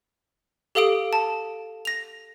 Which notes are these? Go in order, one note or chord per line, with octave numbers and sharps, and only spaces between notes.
G4 A4 F5 D#6 D7
A5
A#6 F7